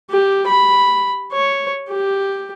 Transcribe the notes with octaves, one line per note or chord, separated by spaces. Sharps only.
G4
B5
C#5
G4